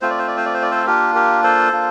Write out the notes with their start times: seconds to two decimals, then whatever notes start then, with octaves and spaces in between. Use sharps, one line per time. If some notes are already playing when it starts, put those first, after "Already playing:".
0.01 A3 C4 F4 C5
0.10 D5
0.19 C5
0.28 D5
0.37 C5
0.45 D5
0.54 C5
0.62 D5
0.71 A4 C5
0.87 A#3 D4 F4 G4 A#4
1.15 G4 A#4
1.44 A4 C5
1.72 A#3 D4 F4